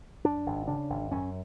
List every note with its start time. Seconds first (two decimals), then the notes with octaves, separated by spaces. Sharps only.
0.25 F#2 D4
0.46 G#1
0.67 C#3 D4
0.90 G#1
1.11 F#2 C#4